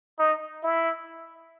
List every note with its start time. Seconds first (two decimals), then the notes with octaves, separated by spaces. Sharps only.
0.19 D#4
0.64 E4